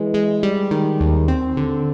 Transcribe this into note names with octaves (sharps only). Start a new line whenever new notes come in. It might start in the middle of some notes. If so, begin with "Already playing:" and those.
Already playing: E3 G#3
G#3
G3
D#3
D#2
C4
D3